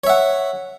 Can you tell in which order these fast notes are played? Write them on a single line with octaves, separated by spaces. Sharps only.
C#5 E5 F#5